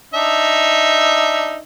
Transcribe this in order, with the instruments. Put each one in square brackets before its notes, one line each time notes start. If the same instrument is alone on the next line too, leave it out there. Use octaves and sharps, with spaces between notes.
[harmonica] D4 D#4 E5